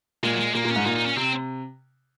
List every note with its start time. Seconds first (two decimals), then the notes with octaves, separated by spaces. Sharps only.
0.23 A#2 G#3
0.33 F#3
0.39 G#3
0.54 A#2 A#3
0.65 A#2
0.70 C#4
0.76 G#2
0.86 A#2 D#4
0.96 D#4
1.06 C#4
1.17 C3 C4